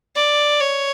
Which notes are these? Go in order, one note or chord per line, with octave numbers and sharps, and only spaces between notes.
D5
C#5